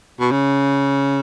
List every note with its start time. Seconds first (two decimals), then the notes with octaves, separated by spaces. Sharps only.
0.20 B2
0.31 C#3